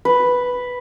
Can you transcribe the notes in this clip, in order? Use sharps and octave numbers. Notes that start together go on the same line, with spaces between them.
B4